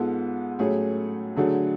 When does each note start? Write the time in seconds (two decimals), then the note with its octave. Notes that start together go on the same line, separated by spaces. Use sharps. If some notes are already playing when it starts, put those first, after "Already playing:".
Already playing: G#2 G#3 B3 F4 A4
0.59 A2 F#3 A3 C#4 G#4
1.36 D3 F#3 A3 D4 G#4